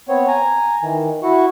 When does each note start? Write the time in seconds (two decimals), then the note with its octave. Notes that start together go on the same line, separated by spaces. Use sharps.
0.09 B3 C4 C#5
0.28 G#5 A#5
0.83 D#3 E3
1.23 E4 F#4 C#6